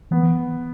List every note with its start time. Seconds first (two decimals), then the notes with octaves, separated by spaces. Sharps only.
0.11 E3 B3
0.23 E3